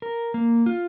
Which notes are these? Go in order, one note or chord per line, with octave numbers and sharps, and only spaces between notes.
A#4
A#3
F4